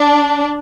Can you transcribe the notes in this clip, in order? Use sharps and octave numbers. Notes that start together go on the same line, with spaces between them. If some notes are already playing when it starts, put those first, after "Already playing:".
Already playing: D4